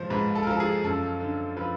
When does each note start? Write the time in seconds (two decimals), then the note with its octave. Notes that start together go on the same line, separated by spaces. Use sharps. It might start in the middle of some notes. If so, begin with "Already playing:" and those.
Already playing: G#2 F3 C5
0.10 G#2 B4
0.35 A4
0.43 A#4
0.47 F3 A4
0.60 G#4
0.84 F#2 A4
1.20 D3
1.56 F3 B4